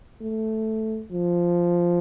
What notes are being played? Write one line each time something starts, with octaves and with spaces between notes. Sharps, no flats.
A3
F3